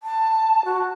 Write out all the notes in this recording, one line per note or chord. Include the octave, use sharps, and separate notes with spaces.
A5
F#4